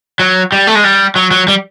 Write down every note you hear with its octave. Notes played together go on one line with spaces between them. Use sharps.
F#3
G3
A3
G#3
G3
F#3
F#3
G3